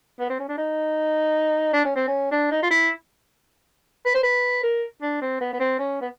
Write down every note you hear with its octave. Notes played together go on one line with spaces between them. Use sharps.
B3
C4
C#4
D4
D#4
D4
C#4
C4
C#4
D4
D#4
F4
E4
B4
C5
B4
A#4
D4
C4
B3
B3
C4
C#4
B3